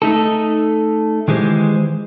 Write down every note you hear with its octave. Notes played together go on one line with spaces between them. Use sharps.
A3 D#4 A4
D#3 E3 G#3 G4 C5